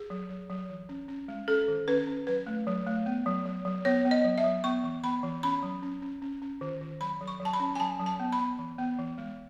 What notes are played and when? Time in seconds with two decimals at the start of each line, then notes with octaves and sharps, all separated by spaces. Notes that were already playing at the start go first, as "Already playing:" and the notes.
Already playing: G#4
0.10 F#3
0.30 F#3
0.50 F#3
0.70 E3
0.89 C#4
1.08 C#4
1.28 G#3
1.48 C#4 A4
1.68 D#3
1.88 C#4 B4
2.07 C#4
2.27 F#3 B4
2.47 A3
2.67 F#3
2.87 A3
3.06 B3
3.26 F#3
3.45 F#3
3.65 F#3
3.85 B3 C#5
4.05 B3
4.11 D#5
4.24 F#3
4.38 E5
4.44 F#3
4.64 B3 C#6
4.84 E3
5.04 B3 B5
5.23 E3
5.43 C#4 B5
5.63 F#3
5.82 C#4
6.02 C#4
6.22 C#4
6.42 C#4
6.61 D#3
6.81 D#3
7.01 F#3 B5
7.21 F#3
7.28 C#6
7.40 F#3
7.45 A5
7.53 B5
7.60 C#4
7.75 G#5
7.80 F#3 A5
8.00 F#3
8.06 A5
8.20 B3
8.32 B5
8.39 B3
8.59 E3
8.78 B3
8.99 E3
9.18 G#3